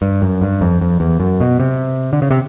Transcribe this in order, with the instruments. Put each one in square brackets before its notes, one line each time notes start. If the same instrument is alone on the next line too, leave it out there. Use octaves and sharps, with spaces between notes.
[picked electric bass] G2
F#2
G2
F2
F2
E2
F#2
B2
C3
D3
C#3
C3